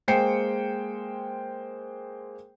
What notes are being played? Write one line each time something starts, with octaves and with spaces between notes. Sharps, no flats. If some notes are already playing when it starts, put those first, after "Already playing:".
G#3 A#3 C5 G5 C7 C#7